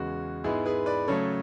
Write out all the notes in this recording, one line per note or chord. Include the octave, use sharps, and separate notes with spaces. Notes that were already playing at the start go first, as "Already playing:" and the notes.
Already playing: E2 C#3 G#3 F#4
G#2 G#3 B3 E4 G#4
G#4 B4
B4 D5
C#3 F#3 A3 A4 C#5